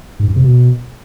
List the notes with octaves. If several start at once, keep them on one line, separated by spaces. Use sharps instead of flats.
G#2
F#2
C3
B2